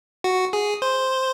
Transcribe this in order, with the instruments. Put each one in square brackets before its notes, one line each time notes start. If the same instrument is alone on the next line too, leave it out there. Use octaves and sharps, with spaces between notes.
[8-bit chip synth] F#4
G#4
C5